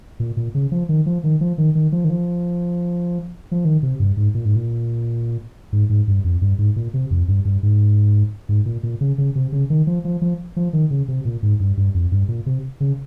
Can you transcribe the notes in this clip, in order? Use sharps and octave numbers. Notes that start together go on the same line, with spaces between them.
A#2
A#2
C#3
F3
D#3
F3
D#3
F3
D#3
D#3
F3
D#3
F3
F3
D#3
C3
G2
G#2
A#2
G#2
A#2
G#2
G#2
G2
F2
G2
G#2
A#2
C3
F2
G2
G2
G#2
G#2
A#2
A#2
C#3
C#3
C3
C#3
D#3
F3
F3
F3
F3
D#3
C#3
C3
A#2
G#2
G2
G2
F2
G2
A#2
C3
C#3